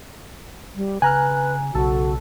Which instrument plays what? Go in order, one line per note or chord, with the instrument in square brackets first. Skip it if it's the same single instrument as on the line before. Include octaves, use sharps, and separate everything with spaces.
[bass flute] G3
[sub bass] C#3 [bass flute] B4 [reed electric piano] G#5 A#5 F6 [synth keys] F#6
[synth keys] B1 A4 [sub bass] C#3 [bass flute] F#4